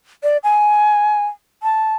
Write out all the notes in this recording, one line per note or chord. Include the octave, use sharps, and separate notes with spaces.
D5
G#5
A5